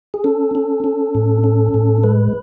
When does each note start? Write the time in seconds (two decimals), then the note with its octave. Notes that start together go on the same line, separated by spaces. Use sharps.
0.14 G#4
0.24 C#4 A4
0.55 C#4
0.84 C#4
1.15 A2
1.44 C#4
1.74 A2
2.04 G#3 B4